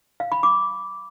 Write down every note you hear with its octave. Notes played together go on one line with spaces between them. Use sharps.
F5
B5
D6